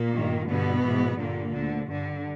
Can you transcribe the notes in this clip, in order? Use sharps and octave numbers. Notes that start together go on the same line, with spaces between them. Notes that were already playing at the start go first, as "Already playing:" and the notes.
Already playing: A#2 A#3
G2 D#3
G2 B2 D3 B3
G#2 E3
G2 A#2 D3 A#3
D2 D3
G2 D3